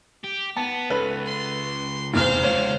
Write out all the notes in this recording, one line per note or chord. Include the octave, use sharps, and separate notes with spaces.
G4
B3 A5
C#2 A4 B4
C6
F1 E2 C5 F5 F6
C#2 D3 F4 C#5